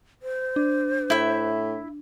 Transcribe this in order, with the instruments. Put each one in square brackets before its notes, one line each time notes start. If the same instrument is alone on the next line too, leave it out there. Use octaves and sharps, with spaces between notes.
[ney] C5
[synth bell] D4
[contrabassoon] A2 [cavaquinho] E4 E5